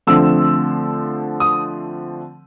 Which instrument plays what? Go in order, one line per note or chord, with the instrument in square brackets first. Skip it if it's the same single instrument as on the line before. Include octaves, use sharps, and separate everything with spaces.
[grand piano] D3 F3 A3 C4 E6
D#6